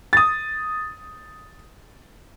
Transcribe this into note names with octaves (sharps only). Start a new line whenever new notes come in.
D#6 A6